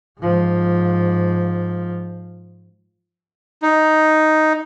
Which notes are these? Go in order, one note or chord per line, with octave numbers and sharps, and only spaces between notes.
G#2 F3
D#4